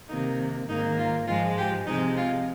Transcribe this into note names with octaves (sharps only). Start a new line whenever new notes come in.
C3 D#3 A#3 D#4
G#2 D#3 A#3 D#4
F4
G#2 F3 G#3 F4
G4
C3 F3 G#3 D#4
F4